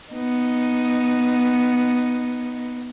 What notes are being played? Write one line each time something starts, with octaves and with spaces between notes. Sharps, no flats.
B3 D#4